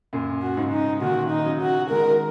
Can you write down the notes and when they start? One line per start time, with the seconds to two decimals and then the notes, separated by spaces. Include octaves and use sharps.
0.13 F#2 A#2
0.43 F#4
0.57 G#2 C#3
0.72 D#4
1.02 A#2 D#3 F#4
1.31 D#4
1.46 C#3 F#3
1.61 F#4
1.90 D#3 G#3 A#4